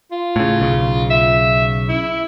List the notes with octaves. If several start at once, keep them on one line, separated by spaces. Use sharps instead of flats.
F4
A2 C#3
B1 C#3
E5
E4